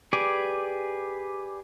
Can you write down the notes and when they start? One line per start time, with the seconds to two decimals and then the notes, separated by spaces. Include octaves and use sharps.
0.13 G4 G#4 B4 D5 G#5